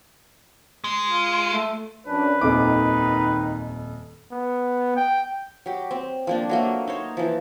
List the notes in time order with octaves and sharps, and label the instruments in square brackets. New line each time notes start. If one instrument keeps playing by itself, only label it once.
[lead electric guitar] G#3
[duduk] F4
A3
[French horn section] F#2 C#4 D4 [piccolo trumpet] B4
[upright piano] D#1 F2 D6 [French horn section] D#3 D#4
[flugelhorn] B3
G5
[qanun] F#3 G4
C4
F3 A#3 D4
F#3 A3 A#3
D#4 C5 C#5
E3 F3